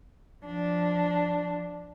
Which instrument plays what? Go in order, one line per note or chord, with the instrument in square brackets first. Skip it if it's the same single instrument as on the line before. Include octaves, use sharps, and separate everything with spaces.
[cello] F3 D4